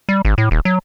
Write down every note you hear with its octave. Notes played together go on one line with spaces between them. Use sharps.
G3
G#1
A2
D#1
F#3